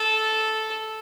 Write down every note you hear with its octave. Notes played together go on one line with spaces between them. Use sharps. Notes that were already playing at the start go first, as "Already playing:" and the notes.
Already playing: A4